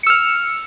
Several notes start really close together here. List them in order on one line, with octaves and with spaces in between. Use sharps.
C#7 E6 F6